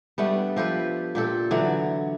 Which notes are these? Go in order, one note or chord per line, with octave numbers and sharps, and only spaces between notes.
G3 A3 B3 D4
F3 G4 A4 B4
A#2 G4 A4
D3 E3 F#3 D4